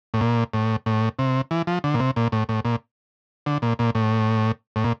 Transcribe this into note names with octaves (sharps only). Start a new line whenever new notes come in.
A2
A#2
A2
A2
C3
E3
F3
D3
A#2
C3
A#2
A2
A2
A#2
D3
A#2
A#2
A2
A2
A#2